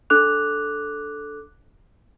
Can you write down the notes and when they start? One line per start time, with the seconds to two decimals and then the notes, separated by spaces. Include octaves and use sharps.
0.10 D4 A4 D6 F#6 F7